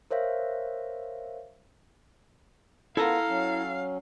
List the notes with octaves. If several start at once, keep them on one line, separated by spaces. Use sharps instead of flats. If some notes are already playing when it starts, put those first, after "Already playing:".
A#4 C5 C#5 E5 F5
B3 E4 F4 A4 A#4 F5 A#5
F#3 C#4